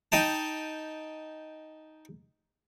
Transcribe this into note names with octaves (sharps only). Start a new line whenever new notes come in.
D#4 D#5 G5 A5